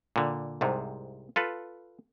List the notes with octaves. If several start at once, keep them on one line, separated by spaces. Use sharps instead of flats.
A#2 D3
C2 G#2 C3
F4 A4 B4